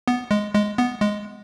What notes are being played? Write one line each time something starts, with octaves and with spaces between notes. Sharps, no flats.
B3
G#3
G#3
B3
G#3